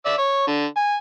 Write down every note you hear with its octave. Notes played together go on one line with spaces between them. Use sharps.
D5 E5 E6
C#5
D3
G#5